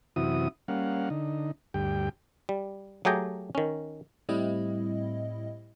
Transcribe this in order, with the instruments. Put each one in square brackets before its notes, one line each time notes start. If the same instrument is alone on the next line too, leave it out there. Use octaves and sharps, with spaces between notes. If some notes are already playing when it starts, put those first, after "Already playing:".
[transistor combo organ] F#2 C3 E3 E4 F#4 D#6
G3 A#3 C#4 F5 F#5
D3 D#4
D2 G2 G4 G5
[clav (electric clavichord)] G3
F#3 A3 G4 G#4 G5 A#5
D#3 C#4
[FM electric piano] A2 G3 C4 E4 D#5